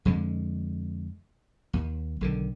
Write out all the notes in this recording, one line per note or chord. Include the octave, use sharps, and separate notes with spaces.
F2 D3 G#3
D#2
B1 D3 D#3